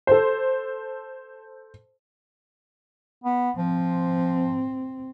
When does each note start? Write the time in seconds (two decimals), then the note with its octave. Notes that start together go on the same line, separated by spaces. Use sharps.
0.07 A4 C5
3.24 B3
3.57 F3 C4